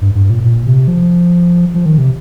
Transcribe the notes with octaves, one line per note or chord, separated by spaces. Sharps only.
G2
G2
A#2
A#2
C3
F3
F3
D#3
C3